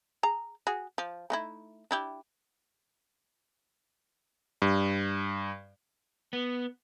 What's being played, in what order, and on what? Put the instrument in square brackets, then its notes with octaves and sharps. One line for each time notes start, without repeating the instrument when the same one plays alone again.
[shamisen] G#4 A#5
F#4 G#4
F3
A3 D#4 E4
D4 E4 G4
[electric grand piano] G2
[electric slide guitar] B3